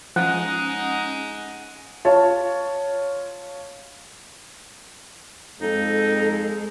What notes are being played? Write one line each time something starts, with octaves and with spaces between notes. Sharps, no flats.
F3 G#3 C#4 D#4 F#5
F4 C#5 A5
F2 G#3 D#4 A4